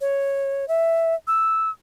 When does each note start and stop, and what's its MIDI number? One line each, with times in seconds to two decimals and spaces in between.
0.01 0.68 73
0.68 1.15 76
1.27 1.70 88